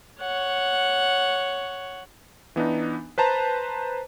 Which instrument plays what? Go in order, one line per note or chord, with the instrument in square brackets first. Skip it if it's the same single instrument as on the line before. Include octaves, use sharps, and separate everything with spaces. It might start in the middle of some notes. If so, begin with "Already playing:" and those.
[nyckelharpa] C#5 F#5
[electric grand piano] E3 B3 D4 D#4
B4 C5 A5 A#5